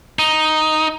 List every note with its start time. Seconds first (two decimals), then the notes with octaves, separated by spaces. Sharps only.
0.19 D#4